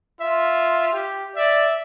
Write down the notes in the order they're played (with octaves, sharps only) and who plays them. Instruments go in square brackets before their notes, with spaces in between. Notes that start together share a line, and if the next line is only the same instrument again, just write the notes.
[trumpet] F4 [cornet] E5
[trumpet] G4
[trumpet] D5 [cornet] E5